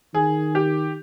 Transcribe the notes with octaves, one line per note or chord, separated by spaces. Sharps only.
D#3 G#4
G4